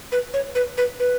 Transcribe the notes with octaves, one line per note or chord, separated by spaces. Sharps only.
B4
C#5
B4
B4
B4